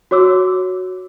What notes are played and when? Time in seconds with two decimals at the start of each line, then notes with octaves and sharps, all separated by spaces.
0.11 F#4 C#5 D6 E6